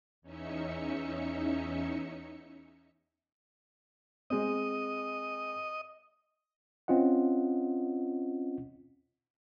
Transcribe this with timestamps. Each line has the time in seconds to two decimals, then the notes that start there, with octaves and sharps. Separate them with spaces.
0.22 E2 C#4 D#4 E5 C#7
4.30 G#3 C4 D#5
6.88 C4 C#4 F4 D#5 F#5